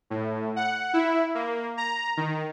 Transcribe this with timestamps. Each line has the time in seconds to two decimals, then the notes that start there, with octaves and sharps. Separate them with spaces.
0.10 A2
0.56 F#5
0.94 E4
1.35 A#3
1.77 A#5
2.17 D#3